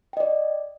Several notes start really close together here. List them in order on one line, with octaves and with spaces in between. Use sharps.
G5 D#5 D5